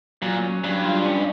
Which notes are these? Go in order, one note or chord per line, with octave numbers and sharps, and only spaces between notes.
A#2 F#3
C#4
G2 F#3
F4
C#4